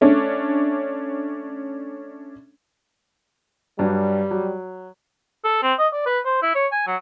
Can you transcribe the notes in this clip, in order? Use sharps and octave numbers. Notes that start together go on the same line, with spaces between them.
A3 C#4 D4
G2 F#3 G3
F#3
A4
C4
D#5
D5
B4
C5
E4
C#5
G#5
F#3